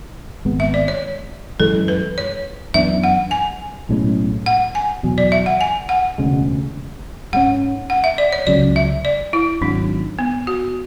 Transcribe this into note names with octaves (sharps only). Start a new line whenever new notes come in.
G#1 G#2 G#3 B3
E5
D5
C#5
F#2 E3 G#3 A4
B4
C#5
F#2 E3 B3 D4 E5
F#5
G#5
B1 A2 G#3 C#4
F#5
G#5
E2 B2 F#3
D5
E5
F#5
G#5
F#5
E1 D2 C#3 G#3
G#2 G#3 C#4 F#5
F#5
E5
D5
C#5
C#2 C#3 F#3 D5
E5
D5
E4
G#1 G#2 F#3 D4
B3
F#4